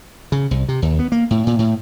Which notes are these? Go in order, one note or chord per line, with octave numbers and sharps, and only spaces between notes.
C#3
C2
C3
D#2
B3
A#3
A2
A#2
A2